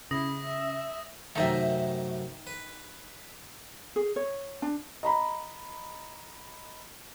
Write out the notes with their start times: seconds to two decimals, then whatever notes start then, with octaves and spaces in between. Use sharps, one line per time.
0.11 C#3 E4 D#6 A#6
0.44 E5
1.35 F#2 C3 D#3 A3 D#4 E5
2.47 B4
3.96 G#4
4.16 C#5
4.62 D4
5.03 D#5 A#5 B5